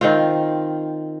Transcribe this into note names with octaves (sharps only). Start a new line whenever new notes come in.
D#3 C4 F4